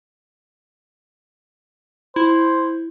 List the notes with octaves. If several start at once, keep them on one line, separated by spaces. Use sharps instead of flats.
E4 C5